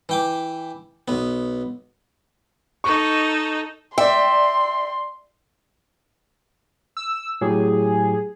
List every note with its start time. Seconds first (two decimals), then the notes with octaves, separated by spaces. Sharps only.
0.09 E3 G5 D6
1.08 B1 B3
2.84 D#4 A4 D#5 C#6
3.98 D5 E5 G5 C6
6.97 E6
7.41 A2 F#3 G4 G#4